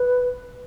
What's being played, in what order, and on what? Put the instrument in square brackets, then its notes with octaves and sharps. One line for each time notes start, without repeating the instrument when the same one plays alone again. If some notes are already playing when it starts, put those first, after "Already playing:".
Already playing: [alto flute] B4